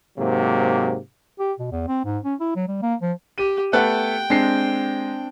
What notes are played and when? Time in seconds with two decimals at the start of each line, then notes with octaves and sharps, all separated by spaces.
0.19 G#2 C3 F#3 A#3
1.40 G4
1.59 B2
1.72 E2
1.88 C4
2.05 G#2
2.25 C#4
2.40 E4
2.56 F#3
2.68 G3
2.82 A#3
3.02 F3
3.38 G4 D#7
3.73 A3 B3 A4 F#5 G5 F#6
4.30 G#3 C4 D4 C7